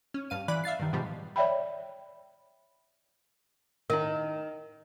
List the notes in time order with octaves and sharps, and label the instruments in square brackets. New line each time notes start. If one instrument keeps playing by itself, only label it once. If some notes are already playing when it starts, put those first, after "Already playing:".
[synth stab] C#4
G2 F5 D#7
E3 D5 B5 F#6
E5 F5 A6 C7
G2 D#3
G#2 B2 D#3 F3 G3
[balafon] C#5 D5 E5 G5 B5
[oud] D#3 [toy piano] E4 A#4